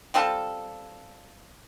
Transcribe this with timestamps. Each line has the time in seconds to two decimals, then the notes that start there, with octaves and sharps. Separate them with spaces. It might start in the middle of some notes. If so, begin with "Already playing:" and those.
0.14 G3 C4 F4 A4